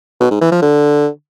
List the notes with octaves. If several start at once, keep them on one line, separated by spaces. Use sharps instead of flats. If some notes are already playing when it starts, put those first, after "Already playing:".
B2
G#2
E3
F3
D3